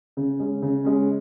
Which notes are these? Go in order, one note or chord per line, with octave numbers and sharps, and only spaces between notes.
C#3
G#3 C#4
C#3
G#3 C#4